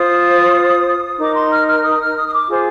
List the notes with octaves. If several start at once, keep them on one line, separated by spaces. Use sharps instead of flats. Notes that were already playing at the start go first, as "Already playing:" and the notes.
Already playing: F4 C5 D#6
D#4 A#4 D6
C6
F6
F6
D#6
F6
D#6
D#6
D6
F4 G#4 C5